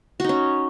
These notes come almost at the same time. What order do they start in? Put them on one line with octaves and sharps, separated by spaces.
F#4 D#4 C#4